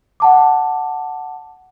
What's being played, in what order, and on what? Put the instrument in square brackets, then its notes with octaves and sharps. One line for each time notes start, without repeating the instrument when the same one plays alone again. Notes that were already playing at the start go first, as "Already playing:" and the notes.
[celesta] F#5 A5 D6